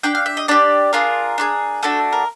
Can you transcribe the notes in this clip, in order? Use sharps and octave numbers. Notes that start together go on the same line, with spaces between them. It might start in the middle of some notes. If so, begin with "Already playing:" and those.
D4 G4 G5
F5
E5
D#5
D4 G4 D5
D4 F4 G#4 A#4
D4 F4 G#4
A3 D4 F#4 A4
A#4